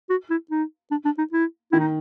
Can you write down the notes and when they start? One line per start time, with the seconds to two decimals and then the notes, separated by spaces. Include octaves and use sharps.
0.10 F#4
0.30 E4
0.51 D#4
0.91 D4
1.05 D4
1.18 D#4
1.32 E4
1.72 D#3 E4
1.79 D#4